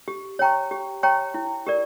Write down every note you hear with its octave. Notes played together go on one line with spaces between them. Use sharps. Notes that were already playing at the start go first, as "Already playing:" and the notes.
G4
C#5 G5 A#5 C#6
G4
C#5 G5 A#5 C#6
E4
G4 A#4 D5